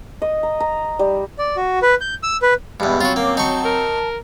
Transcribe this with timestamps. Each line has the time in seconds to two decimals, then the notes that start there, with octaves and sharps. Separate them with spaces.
0.22 D#5
0.43 A#5
0.60 A#5
0.99 G3
1.38 D5
1.56 F#4
1.82 B4
2.01 G6
2.23 E6
2.42 B4
2.80 E2 G2 G#3 B5
3.01 F#3 C4 C#4 F4 F#4
3.16 A#3 D6
3.37 D#4 A5 C#6
3.65 A#4